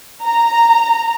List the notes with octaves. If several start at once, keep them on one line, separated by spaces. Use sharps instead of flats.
A#5